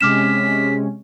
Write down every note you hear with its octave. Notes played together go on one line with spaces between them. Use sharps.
C3 G#3 C#4 D6 F6 B6 E7